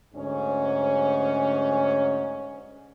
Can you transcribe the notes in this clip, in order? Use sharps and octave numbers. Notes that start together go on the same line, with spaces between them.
D2 G#2 C#4